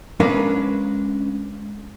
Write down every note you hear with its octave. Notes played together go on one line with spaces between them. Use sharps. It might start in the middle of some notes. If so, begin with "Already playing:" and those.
G#3 C#4 D4 A#4 B4 F5